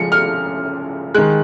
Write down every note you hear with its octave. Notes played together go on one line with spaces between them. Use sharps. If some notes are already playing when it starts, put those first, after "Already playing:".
Already playing: C#3 F3 G#3 C#7
F6
D#3 G#3 F#6